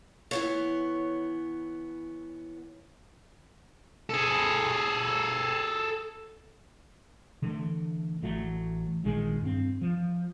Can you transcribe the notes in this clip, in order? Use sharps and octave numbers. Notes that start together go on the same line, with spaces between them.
E3 B3 C#5
G#4 A4
D3 E3 A3
A1 E3 F#3 A3
A#1 D#3 G#3
G2 C4
F3